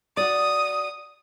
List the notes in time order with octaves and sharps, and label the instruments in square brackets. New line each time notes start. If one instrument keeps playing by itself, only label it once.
[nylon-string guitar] F#4 D5 [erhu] D#6